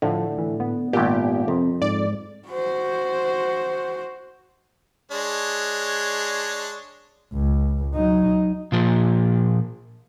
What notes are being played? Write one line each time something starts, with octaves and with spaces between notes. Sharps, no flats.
A2 D3 F3
E3
B3
G#1 A#2 G4
F2 C3
G#2 D5
F#4 C5
G#3 D4 C#5
C#2
F#3 D#4
A#2 F3